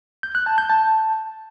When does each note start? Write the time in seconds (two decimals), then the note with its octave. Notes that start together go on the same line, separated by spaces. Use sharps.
0.23 G6
0.35 F#6
0.46 A5
0.58 G6
0.70 A5